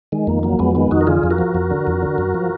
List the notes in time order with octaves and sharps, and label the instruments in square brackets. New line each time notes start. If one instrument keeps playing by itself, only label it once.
[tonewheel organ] D#3 G#3
F2 A#3
F#3 A#3
F2 G#3 B3
D#3 G#3 B3
F2 D#4 F#4
A#4
D3 F4 G#4
F2
F#4 A#4
F3
F2
D3
F2
D3
F#2
F3